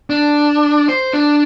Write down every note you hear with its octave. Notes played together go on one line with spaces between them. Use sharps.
D4
C5
D4